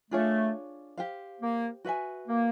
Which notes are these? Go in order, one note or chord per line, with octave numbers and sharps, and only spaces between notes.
A3 D4 F4 G#4 C#5
G4 C5 F5
A#3
F#4 B4 E5 G#5
A#3